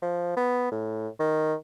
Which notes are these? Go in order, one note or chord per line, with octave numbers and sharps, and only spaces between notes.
F3
B3
A2
D#3